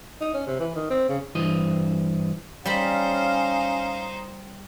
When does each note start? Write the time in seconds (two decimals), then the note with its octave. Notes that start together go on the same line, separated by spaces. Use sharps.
0.21 D#4
0.34 C#4
0.47 C3
0.59 E3
0.75 D#3
0.90 C4
1.09 C#3
1.35 G2 E3 C5 D#5
2.65 G3 C#4 D#4 C5 F5 B5